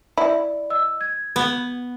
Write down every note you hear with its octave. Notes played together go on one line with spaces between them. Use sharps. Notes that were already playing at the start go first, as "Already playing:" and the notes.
E4 D5
D#5 E6
G#6
B3